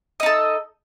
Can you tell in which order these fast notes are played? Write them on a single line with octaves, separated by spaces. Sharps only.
D#5 D#4 A4